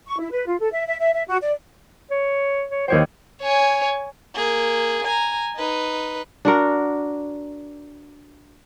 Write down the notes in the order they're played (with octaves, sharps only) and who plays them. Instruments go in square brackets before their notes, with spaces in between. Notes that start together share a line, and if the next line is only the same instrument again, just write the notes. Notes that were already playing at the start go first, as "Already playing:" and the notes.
[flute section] C#6
E4
B4
F4
A4
E5
E5
E5
E5
F#4
D5
[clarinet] C#5
C#5
[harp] D#2 C#5 G5 [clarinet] C5
[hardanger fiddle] C#5 G#5
[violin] A#3 G#4
G#5 A#5
D#4 B4
[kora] D4 F#4 A#4